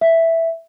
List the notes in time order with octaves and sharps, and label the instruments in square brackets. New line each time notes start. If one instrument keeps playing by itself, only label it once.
[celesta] E5